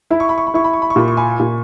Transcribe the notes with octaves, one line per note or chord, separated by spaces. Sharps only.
E4 B5
C#6
B5
C#6
B5
E4 C#6
B5
C#6
B5
C#6
A#2 B5
C#6
G#5 B5
A#2